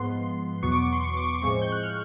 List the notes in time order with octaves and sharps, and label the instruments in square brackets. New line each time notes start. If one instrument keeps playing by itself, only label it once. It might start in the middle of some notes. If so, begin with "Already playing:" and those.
Already playing: [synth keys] G#2 F3 G#3 B3 C6
E2 B2 F#3 B3 C#6
D6
C#6
C6
C#6
D6
C#6
A2 F3 G#3 C4 C#6
G6
F#6
F6